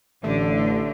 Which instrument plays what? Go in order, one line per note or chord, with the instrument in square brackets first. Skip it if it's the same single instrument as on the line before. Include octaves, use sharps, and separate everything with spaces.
[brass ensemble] A1 [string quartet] D3 [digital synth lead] A3